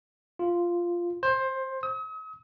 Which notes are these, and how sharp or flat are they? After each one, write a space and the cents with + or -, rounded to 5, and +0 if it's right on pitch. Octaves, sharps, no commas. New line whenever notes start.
F4 -5
C5 +15
D#6 +45